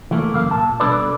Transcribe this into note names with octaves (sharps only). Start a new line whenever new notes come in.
E3 A3 A#3
C#2 F#2 A#3 F5
A#2 F#3 A5
B2 G3 D4 A4 B4 D5